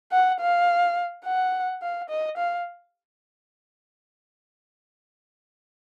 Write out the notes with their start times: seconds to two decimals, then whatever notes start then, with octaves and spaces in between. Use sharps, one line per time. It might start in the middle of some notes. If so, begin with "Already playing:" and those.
0.12 F#5
0.40 F5
1.25 F#5
1.82 F5
2.09 D#5
2.37 F5